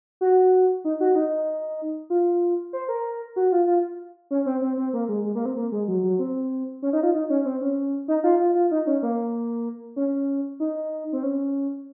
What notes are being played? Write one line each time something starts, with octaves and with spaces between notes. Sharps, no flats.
F#4
D#4
F#4
D#4
F4
C5
A#4
F#4
F4
F4
C#4
C4
C4
C4
A#3
G#3
G#3
A#3
C4
A#3
G#3
F#3
F#3
C4
C#4
D#4
F4
D#4
C#4
C4
C#4
D#4
F4
F4
F4
D#4
C#4
A#3
C#4
D#4
C4
C#4